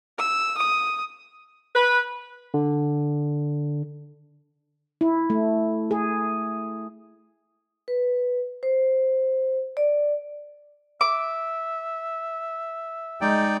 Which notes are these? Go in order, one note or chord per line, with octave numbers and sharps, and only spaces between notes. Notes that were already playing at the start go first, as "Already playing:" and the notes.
E6
D#6
B4
D3
E4
A3
G#4
B4
C5
D5
E5 D6
G#3 D#4 D5 G5